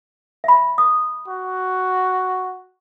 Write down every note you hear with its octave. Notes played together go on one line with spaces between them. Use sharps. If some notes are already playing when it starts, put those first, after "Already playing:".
E5 B5
D#6
F#4